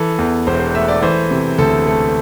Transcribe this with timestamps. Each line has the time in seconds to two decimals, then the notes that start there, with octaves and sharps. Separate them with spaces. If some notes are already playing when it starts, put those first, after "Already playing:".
Already playing: E3 A4
0.19 E2
0.47 E1 C5
0.60 C5
0.75 A3 E5
0.88 D5
1.02 E3 C5
1.31 C3
1.58 D2 A4
1.87 A3 A4